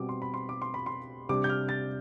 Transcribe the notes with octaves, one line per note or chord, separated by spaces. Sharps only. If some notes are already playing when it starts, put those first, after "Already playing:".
Already playing: B2 G3 C4 D6
C6
B5
C6
D6
C6
B5
C6
C3 G3 D4 D6
G6
F6
A6